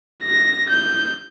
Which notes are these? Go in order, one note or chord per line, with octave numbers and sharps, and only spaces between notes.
A#6
G6